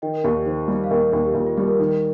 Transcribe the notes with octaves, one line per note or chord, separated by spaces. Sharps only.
D#3 D#5 G5
A#4
D#2 G4
G4
D#3 C5
G3
F5
D#2 A#4 D#5
A#4
D#2
G4
D#2 F4
F4
G3 G4
A#4
D#3